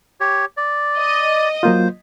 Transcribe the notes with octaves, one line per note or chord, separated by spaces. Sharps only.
G4 C#5
D5
D#5
F#3 A#3 F4 C5